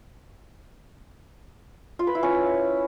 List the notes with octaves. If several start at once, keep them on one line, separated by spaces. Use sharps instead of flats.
F4
B4
E4
C#4